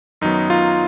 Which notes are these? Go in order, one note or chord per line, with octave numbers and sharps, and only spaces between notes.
F#2 D#3 F#3 B3 D#4
F4